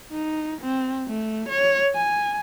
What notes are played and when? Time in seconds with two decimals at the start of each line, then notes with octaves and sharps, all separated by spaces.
0.12 D#4
0.61 C4
1.08 A3
1.49 C#5
1.95 G#5